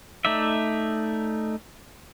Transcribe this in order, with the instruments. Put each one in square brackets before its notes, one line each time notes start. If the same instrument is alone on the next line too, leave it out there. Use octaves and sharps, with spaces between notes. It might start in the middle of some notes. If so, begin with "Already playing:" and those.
[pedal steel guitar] A3 D#4 D5 E5